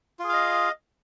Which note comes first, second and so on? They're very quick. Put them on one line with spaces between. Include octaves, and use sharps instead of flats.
F4 G#4 F5 D#5